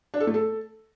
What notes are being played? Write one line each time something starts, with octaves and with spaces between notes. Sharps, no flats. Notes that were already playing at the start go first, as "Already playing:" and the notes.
D4
A4
A3
A4